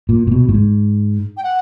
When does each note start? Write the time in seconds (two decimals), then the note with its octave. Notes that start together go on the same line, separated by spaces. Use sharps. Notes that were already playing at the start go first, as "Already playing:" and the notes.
0.09 A#2
0.27 A#2
0.32 B2
0.49 A2
0.54 G#2
1.37 G5
1.44 F#5